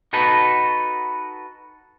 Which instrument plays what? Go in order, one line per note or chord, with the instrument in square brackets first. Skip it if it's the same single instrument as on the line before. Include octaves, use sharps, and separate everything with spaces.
[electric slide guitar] D#4 F#4 A4 B4